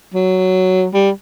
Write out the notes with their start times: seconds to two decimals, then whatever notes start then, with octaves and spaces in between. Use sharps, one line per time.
0.14 F#3
0.94 G3